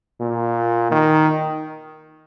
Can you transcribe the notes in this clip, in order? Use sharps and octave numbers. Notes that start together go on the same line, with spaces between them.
A#2
D#3